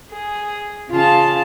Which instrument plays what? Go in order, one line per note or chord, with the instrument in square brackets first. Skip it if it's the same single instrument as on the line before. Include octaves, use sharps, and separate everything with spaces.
[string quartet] G#4
C#3 F4 G#4 F5 A5